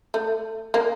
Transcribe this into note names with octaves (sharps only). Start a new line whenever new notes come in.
A3
A#3